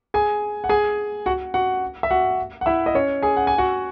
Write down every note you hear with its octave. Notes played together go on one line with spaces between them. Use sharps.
G#4 G#5
F#5
G#4 G#5
F#4 F#5
F#4 F#5
E5
F#4 F#5
F#5
E4 E5
D#5
C#4 C#5
G#4 G#5
F#5
G#5
F#4 F#5